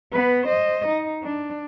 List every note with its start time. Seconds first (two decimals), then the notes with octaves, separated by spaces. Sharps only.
0.12 B3 B4
0.46 C5 D#5
0.88 D#4
1.23 D4